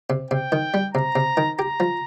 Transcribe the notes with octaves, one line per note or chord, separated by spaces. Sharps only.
C3
C3 G5
D#3
G3
C3 A#5
C3
D#3
G4 A#5
F3